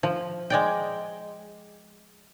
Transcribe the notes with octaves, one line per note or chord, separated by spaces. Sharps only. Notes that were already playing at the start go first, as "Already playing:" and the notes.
F3
G#3 D5 G5